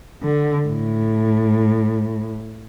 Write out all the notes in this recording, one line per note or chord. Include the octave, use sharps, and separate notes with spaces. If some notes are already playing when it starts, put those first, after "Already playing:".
D3
A2